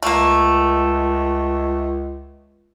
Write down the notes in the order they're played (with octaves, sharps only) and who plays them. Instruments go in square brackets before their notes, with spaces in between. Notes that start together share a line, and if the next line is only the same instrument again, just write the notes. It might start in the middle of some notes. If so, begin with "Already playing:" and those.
[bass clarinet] C#2 [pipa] A3 A#3